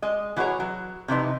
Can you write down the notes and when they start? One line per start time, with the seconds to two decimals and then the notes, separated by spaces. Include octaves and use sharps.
0.02 G#3 D#5
0.36 E3 E4 F#4 G#4 C#5 A#5
0.60 F#3
1.08 C3 E3 F3 D#4